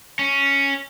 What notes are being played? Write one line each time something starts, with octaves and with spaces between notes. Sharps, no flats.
C#4